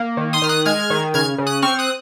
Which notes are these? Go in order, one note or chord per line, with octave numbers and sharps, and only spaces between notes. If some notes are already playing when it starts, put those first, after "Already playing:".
Already playing: A#3
D#3
C6 D#6
D#3 F6
D#6 F#6
G#3 F6 G#6
D#3
C#3 F6 G#6
C#3
D#6 F#6
C4 C#6 F6
D#6 F#6